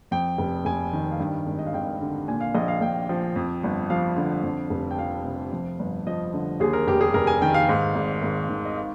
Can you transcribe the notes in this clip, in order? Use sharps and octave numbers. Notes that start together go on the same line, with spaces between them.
F2 G5
F1
F1 G#5
D#3
F5
G2 G5
G#1
D#5
F5
G#1 G5
D3
A#2 G#5
F5
A#1 D#5
F5
A#1 G5
F3
F2
G1
F3 F5
D3
F2
F1
G5
F3 F5
C3
F2
G1
F3 D#5
D3
D#2 G#4
A#4
F1 G4
G#4
F1 A#4
G#5
D#3 G5
F5
G#2
G#1
G#1
D#3
D#5
F5